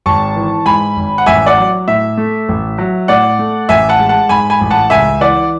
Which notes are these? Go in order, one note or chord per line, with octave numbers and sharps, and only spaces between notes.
G#1 A5 C#6
E3
G#2 G#5 B5
G#1
F#5
A1 E5 G#5
D5 F#5
F#3
A2 E5
A3
A1
F#3
A2 D5 F#5
A3
A1 E5 G#5
F#5 A5
G#3
F#5 A5
G#2 G#5 B5
G#5 B5
A1
F#5 A5
C#2 E5 G#5
E3 D5 F#5